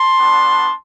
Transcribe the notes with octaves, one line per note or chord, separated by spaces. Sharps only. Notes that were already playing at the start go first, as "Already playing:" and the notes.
Already playing: A5 C6
G3 B3 D4 F#4